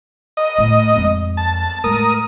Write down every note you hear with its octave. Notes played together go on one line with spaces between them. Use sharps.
D#5
A2 A3
F2 G#3
A5
A2 G#3 A#4 D#6